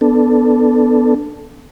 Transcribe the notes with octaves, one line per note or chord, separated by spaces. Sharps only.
B3 D4 A4